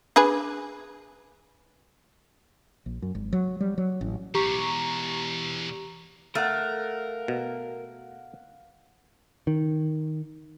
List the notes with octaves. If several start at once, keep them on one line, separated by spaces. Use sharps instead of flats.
D4 G#4 B4
A#1
F#2
G#1
F#3
G3
F#3
A1
E2 B2 G4 A#5 C#6
A3 A#4 F5 F#5
B2
D#3